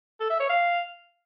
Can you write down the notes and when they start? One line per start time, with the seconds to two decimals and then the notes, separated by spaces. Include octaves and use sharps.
0.20 A4
0.30 E5
0.40 C#5
0.49 F5